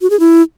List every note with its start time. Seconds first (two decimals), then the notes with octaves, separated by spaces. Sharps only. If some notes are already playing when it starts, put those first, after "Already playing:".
0.01 F#4
0.10 G#4
0.20 E4